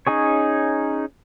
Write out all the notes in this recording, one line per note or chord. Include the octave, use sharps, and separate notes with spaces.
C#4 D#4 G#4 C#5